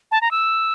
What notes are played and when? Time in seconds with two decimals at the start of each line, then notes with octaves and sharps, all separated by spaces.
0.12 A5
0.21 A#5
0.31 E6